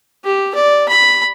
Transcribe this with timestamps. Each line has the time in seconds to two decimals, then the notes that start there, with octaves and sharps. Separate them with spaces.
0.24 G4
0.55 D5
0.88 B5